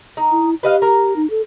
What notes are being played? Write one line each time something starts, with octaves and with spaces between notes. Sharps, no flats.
D#4
E4
G4 B4 D#5 F5
A#4
D#4
A4